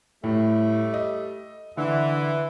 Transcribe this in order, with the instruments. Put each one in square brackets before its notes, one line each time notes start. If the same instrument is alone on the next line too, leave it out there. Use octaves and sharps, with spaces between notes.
[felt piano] A2 [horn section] G3 A3
[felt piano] D#5
[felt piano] D3 [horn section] E3